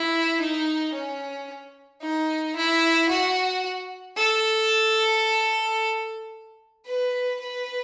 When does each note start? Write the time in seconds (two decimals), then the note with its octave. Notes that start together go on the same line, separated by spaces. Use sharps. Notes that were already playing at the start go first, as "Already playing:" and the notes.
Already playing: E4
0.40 D#4
0.93 C#4
2.01 D#4
2.56 E4
3.09 F#4
4.17 A4
6.86 B4
7.40 B4